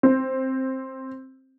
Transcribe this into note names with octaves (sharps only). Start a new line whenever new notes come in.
C4